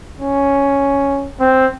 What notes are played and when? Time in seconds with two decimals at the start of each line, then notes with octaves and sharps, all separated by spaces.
0.20 C#4
1.40 C4